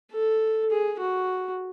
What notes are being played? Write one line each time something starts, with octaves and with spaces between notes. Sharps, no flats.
A4
G#4
F#4